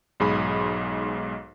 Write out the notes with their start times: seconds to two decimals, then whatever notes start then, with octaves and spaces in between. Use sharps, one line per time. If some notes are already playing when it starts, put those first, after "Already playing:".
0.20 B1 G#2 G#4 B5